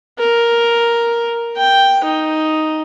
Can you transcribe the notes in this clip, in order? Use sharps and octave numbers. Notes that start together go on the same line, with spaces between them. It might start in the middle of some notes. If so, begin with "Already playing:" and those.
A#4
G5
D#4